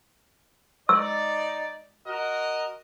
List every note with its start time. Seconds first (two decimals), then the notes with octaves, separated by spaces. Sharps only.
0.89 D#4 D5 E6
2.06 F#4 A#4 D#5